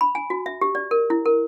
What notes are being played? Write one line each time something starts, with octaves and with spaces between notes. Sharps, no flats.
B5
G#5
F#4
E5
G4
D5
A#4
E4
A#4